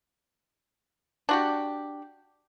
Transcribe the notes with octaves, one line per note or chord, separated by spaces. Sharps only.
D4 F#4 G4